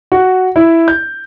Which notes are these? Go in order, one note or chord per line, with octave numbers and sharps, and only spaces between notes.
F#4
E4
G6